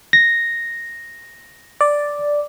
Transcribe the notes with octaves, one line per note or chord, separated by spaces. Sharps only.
A#6
D5